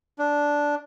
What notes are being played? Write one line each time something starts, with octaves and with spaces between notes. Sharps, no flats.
D4